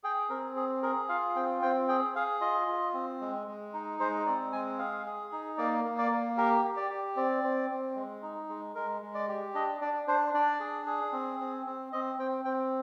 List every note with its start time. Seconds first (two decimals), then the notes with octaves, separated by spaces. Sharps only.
0.04 G#4 G5
0.30 C4 A#4
0.56 G#4
0.83 G#4 A#4
1.09 F4 F5
1.35 C4 G5
1.62 C4 G5
1.88 G#4 G5
2.15 G#4 F5
2.41 F4 D#5
2.68 F4
2.94 C4
3.21 G#3
3.47 G#3
3.74 D#4
4.00 G#3 C5
4.26 C4 D5
4.52 G#3 G#5
4.79 G#4 F5
5.06 G#4
5.32 D#4
5.58 A#3 D5
5.84 A#3
5.98 D5
6.11 A#3
6.37 G4 A#4
6.65 G4
6.77 D5
6.90 G4
7.16 C4 D5
7.44 C4
7.70 C4
7.96 G#3
8.22 D#4
8.49 G#3
8.75 G#3 A#4
9.02 G#3
9.15 D5
9.28 G4
9.55 D4 D#5
9.81 D4 D5
10.08 D4 C5
10.34 D4 D5
10.60 G#4
10.86 G#4
11.13 C4
11.40 C4
11.66 C4
11.93 C4 D#5
12.18 C4 G5
12.45 C4 G5